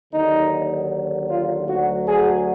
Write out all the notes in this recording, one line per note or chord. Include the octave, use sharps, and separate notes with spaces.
D#2 D3 F#3 D#4
F4
D2 D3 F#3 F#4
G#4